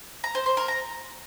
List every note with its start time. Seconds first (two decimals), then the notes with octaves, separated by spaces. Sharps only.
0.24 A#5
0.35 C5
0.46 C5
0.57 A#4
0.68 A#5